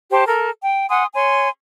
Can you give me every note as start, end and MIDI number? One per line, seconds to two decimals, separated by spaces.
0.11 0.24 67
0.11 0.24 72
0.11 0.24 81
0.25 0.49 69
0.25 0.49 70
0.62 0.87 79
0.89 1.05 78
0.89 1.05 80
0.89 1.05 84
0.89 1.05 87
1.14 1.48 73
1.14 1.48 80
1.14 1.48 84